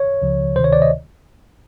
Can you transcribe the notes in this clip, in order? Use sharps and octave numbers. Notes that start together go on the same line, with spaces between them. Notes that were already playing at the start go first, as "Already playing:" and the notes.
Already playing: C#5
C#2 C#3 F3
D2 C3 D#3 C5
C#5
D5
D#5